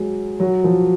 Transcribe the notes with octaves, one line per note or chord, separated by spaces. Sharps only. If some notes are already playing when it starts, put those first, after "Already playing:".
Already playing: F#3 G#3
F#3
F3